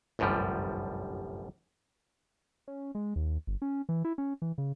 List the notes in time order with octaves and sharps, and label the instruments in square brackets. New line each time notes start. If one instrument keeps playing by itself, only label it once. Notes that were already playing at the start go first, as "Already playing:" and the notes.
[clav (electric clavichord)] G1 C2 F#2 A2 F3 G3
[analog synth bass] C#4
G#3
D#2
G1
C#4
E3
E4
C#4
E3
C#3